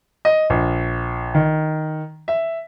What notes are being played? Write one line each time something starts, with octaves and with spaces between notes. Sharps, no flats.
D#5
A#1
D#3
E5